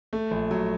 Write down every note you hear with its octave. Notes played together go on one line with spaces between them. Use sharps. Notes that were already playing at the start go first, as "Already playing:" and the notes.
A3
A#1
F#3